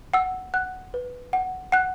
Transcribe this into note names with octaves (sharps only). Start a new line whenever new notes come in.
F#5 E6
F#5 F#6
B4
F#5
F#5 F#6